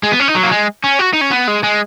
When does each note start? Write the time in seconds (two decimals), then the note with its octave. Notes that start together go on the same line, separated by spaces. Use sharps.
0.03 G#3
0.12 B3
0.20 C#4
0.28 D#4
0.35 F#3
0.43 A#3
0.51 G#3
0.84 C#4
0.99 F#4
1.14 D#4
1.21 C#4
1.31 B3
1.48 G#3
1.64 G#3